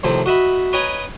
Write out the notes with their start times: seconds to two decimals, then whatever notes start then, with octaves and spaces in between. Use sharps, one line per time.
0.04 A2 C3 D#3 F3 C4
0.26 F#4 D#5 E5 B5
0.73 B4 C#5 D#5 G5 G#5 A#5